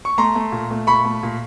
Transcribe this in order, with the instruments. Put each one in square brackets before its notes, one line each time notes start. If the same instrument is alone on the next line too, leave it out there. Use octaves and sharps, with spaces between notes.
[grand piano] C#6
A3 A#5 C6
A3
A#2
A3
A#2 B5 C#6
A3
A#2